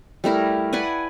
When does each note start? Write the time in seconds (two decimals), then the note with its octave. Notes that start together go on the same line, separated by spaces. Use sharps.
0.24 G3 A3 E4 A#4
0.73 B4 D5 F#5 G#5